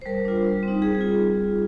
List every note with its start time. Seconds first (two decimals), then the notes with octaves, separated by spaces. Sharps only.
0.01 C5
0.06 G3 A#4
0.25 D4 F4
0.45 G3
0.63 C4
0.68 D#4
0.82 G3 G#4
0.95 G#4
1.01 F4